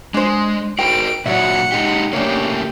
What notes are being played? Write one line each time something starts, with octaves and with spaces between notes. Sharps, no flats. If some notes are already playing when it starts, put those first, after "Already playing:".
G#3 D4 C5
F#4 A#4 C5 G5 D7
A#2 F#3 F#4 C#5 D5 E5 F#5
G#3 D#4 G4
C#3 A3 A#3 D4 G4 C#5